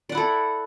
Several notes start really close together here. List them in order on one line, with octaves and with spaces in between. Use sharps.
D5 F#5 E4 A4